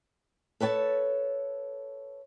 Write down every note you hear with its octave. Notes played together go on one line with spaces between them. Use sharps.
A4 B4 C#5 G#5 A5